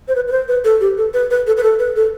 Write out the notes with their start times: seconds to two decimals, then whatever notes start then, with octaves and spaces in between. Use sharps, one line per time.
0.08 C5
0.16 B4
0.27 B4
0.32 C5
0.48 B4
0.64 A4
0.81 G4
0.98 A4
1.14 B4
1.31 B4
1.47 A4
1.57 B4
1.63 A4
1.79 B4
1.96 A4